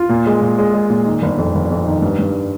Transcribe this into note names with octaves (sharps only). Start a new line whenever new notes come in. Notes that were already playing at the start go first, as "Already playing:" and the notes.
Already playing: F4
A#2
G#3
A#2
G#3
G#3
A#2
D#3
G1
F2
G1
F2
D#3
G2
G2